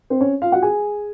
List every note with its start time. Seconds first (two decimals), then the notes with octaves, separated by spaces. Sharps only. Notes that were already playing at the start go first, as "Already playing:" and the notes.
0.10 C4 C5
0.21 C#4 C#5
0.42 F4 F5
0.52 F#4 F#5
0.62 G#4 G#5